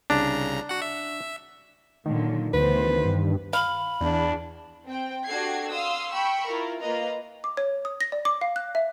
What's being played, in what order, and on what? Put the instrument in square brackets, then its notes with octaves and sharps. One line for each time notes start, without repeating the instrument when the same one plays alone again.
[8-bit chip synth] C2 C#3 A#5 [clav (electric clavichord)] D4
[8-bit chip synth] F#4 F#5
E5
[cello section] A#2 D3 F#3 [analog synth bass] D#3
[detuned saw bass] D2 [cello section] E3 B3 C5 [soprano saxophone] B4
[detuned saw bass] G2
[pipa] F5 [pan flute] B5
[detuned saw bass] E2 [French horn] D4
[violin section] C4 G5
D4 F#4 G4 A4 G#6 C7
F5 C6 D#6 E6
G5 B5 C#6 E6
E4 F4 A#4
A#3 F4 B4 D#5 A#5
[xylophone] D6
C#5
D#6
A#6
D5
D6
F5
F#6
E5